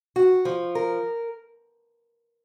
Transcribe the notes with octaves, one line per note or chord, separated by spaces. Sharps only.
F#4
F3
A#4